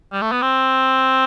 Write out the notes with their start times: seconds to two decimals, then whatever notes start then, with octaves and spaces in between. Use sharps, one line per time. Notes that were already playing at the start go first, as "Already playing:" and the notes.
0.13 G3
0.22 A3
0.32 B3
0.42 C4